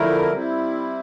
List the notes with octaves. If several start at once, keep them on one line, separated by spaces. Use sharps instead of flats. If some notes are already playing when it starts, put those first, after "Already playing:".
Already playing: F2 D3 A3 E4 A#4
G3 C4 E4